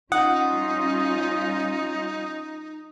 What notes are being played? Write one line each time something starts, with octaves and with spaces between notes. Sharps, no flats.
G3 C#4 D#4 F4 F#5 D#6